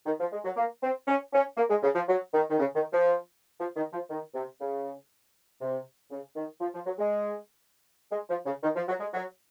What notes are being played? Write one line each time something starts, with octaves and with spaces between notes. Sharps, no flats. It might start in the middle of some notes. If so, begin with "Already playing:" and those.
D#3
F3
G#3
F#3
A#3
C4
C#4
C#4
A#3
G#3
C#3
F3
F#3
D#3
D#3
C#3
D#3
F3
F3
D#3
F3
D#3
C3
C#3
C3
C#3
D#3
F3
F3
F#3
G#3
G#3
F3
C#3
D#3
F3
F#3
G#3
F#3